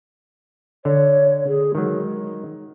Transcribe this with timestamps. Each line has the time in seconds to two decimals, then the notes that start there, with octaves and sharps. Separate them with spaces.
0.85 D3 C#5
1.47 G#4
1.75 D#3 F#3 G#3